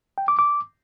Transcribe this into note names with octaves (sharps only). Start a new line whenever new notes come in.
G5
D6
D6